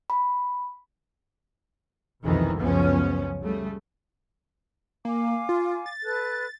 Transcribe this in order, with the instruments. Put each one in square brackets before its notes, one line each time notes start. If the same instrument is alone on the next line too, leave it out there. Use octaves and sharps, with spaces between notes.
[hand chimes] B5
[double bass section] C2 F2 B2 D#3 E3
C#2 F#2 F3 B3 C#4
C#3 G3 A3
[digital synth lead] A#3 [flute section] F5 G#5 D6
[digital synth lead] F4
A6
[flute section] A4 B4 F#6